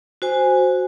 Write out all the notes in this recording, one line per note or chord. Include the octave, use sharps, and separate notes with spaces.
F#4 C5 G#5